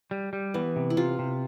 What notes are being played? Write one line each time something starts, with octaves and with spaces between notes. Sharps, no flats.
G3
G3
E3 B3
C3
E4
C3 F4
C3